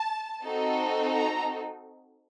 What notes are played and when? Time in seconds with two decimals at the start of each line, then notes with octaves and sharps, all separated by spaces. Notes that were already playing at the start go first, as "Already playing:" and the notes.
Already playing: A5
0.45 C4 D#4 F#4 A4
1.15 A#5